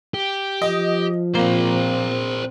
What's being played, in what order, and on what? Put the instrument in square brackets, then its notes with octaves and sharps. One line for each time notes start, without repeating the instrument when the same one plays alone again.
[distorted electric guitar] G4
[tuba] F3 [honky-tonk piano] D#5
[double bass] A#2 C4 [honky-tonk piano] A#3 [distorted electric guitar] A#4 C5